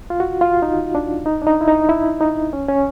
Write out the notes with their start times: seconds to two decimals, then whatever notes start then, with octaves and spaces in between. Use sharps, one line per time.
0.10 F4
0.20 F#4
0.41 F4
0.62 D#4
0.95 D4
1.26 D#4
1.42 D4
1.47 D#4
1.61 E4
1.68 D#4
1.89 E4
2.21 D#4
2.53 C#4
2.68 C#4